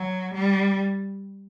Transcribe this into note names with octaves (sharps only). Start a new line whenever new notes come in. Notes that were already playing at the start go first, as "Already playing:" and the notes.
Already playing: F#3
G3